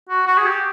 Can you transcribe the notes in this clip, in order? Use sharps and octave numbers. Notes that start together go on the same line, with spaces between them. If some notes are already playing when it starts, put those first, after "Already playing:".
F#4
F#4
G#4
G4